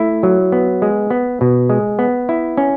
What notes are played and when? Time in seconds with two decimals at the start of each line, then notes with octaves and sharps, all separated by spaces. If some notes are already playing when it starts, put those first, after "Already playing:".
Already playing: A3 E4
0.23 F#3
0.52 B3
0.82 G#3
1.10 B3
1.41 B2
1.70 G#3
1.99 B3
2.29 E4
2.57 C#4